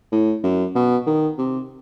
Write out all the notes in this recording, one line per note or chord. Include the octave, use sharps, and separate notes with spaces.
A2
F#2
B2
D#3
C3